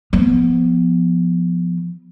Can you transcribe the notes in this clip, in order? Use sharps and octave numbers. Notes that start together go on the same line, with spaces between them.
F3 B3